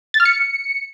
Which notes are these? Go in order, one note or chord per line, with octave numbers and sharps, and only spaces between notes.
A6
F6
C#7